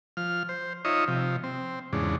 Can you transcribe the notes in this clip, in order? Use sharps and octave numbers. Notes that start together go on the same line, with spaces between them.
F3 F6
C5
D#4 F4 C#5 D#5 E5
C3 F3
C4
E2 G#2 C#3 D4